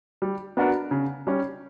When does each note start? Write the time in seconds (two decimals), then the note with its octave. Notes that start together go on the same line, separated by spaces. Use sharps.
0.22 G3
0.57 B3 D4 F#4 A#4
0.91 C#3
1.27 G3 C#4